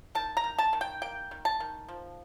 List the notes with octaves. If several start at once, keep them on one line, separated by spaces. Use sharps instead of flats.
D#3 A5
A#5
D#3
A5
D#3
G5
A#3 G5
D#3
A5
D#3
F3